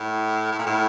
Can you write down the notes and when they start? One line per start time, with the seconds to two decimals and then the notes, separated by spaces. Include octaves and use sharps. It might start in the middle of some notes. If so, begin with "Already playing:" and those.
Already playing: A2
0.52 A2
0.59 A#2
0.67 A2